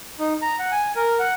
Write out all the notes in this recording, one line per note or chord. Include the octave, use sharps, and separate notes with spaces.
D#4
A#5
F#5
G#5
A#4
F#5